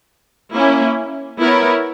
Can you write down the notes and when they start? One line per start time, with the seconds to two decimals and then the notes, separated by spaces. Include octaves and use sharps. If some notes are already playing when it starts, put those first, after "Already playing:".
0.54 A#3 C#4 E4
1.39 B3 E4 A#4 C#5